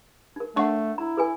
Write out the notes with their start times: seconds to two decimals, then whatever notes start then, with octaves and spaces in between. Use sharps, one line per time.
0.36 D#4 A#4
0.56 A3 D4 C#5 F#5 C#6
0.98 E4 A#5
1.17 A4 B4 G#5